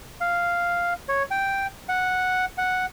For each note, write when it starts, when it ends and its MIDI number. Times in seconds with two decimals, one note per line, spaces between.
0.21 0.94 77
1.09 1.23 73
1.31 1.67 79
1.89 2.45 78
2.58 2.86 78